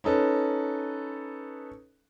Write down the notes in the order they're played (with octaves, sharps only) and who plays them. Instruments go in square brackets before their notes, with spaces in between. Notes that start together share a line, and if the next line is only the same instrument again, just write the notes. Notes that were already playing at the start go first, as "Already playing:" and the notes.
[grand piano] C#4 D#4 A4 B4